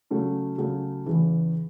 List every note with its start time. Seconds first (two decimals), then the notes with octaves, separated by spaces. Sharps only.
0.11 C#3 F#3 A3 C#4
0.58 C#3 F#3 A3 C#4
1.06 E2 C#3 E3